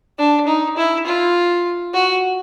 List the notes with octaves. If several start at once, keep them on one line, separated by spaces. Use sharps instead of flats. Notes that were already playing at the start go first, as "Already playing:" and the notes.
D4
D#4
E4
F4
F#4